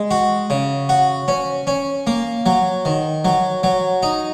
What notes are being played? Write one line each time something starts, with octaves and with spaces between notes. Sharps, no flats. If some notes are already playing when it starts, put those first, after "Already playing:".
Already playing: G#3
F#4
C#3
F#4
C#4
C#4
A#3
F#3
D#3
F#3
F#3
D#4